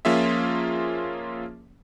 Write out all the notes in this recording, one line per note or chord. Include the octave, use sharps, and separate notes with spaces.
F3 A#3 C#4 F4 G#4 E5